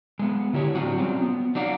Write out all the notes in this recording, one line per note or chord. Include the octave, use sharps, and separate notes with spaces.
G#3 B3
D3 E4 G4 C5 C#5
A2 F#3 C4 D4 F4 F#4
F#3 G3 C4 C#4 F4
B3
F#3 D#4 D5 F5 F#5